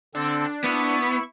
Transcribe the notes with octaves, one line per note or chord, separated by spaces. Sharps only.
D3 C4 D4 A4
B3 E4 C#6